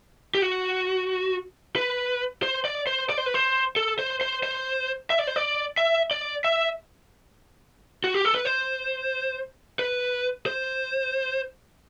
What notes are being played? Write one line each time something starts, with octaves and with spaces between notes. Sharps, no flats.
G4
F#4
B4
C5
D5
C5
D5
C5
B4
C5
A4
C5
C5
C5
E5
D5
C5
D5
E5
D5
E5
F#4
G4
A4
B4
C5
B4
C5